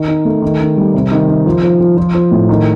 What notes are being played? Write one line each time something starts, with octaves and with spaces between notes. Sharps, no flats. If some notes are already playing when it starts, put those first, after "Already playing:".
Already playing: D#3
D#4
A3
D#3
D#3
G3
C3
D#3
D#3
F3
F3
F3
F3
F3
A2
D#3